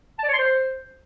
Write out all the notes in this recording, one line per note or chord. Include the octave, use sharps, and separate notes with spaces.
A5
D5
C#5
C6
C5